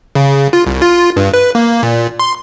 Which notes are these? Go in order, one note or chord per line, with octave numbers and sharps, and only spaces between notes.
C#3
F4
C2
F4
G2
B4
A#3
A#2
C6